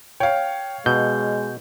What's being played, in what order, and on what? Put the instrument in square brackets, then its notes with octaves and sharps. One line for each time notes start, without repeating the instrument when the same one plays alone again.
[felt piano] C#5 F5 [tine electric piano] G5
[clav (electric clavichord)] B2 [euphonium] G#3 [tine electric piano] G6